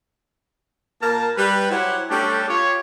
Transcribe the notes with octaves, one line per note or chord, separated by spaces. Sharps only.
A#2 A#3 A#4 A5
G3 B4
F#3 E4 G4 C5 F#5
G3 A3 C#4 D4 G4 A4
F4 G4 C#5